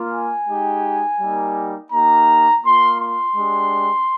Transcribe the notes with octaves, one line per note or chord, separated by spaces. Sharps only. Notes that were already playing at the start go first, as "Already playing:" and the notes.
Already playing: A#3 F4
G#5
G#3 D#4 G4
G3 A#3 D#4 G4
A#3 D#4 G4 A#5
A#3 F4 C6
C6
G#3 D4 G4